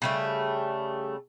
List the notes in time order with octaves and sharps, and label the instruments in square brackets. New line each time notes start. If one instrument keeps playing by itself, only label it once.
[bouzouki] C#3 G3 A3